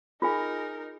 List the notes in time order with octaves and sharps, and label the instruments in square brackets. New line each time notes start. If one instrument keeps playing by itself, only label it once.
[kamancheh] D#4 A#4 [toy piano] F4 G#4 G#5